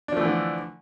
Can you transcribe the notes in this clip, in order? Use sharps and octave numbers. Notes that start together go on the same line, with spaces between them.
D3 E3 F3 A3 D4